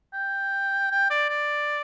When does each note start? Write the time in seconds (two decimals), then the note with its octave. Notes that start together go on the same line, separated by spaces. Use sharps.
0.14 G5
0.91 G5
1.10 D5
1.29 D5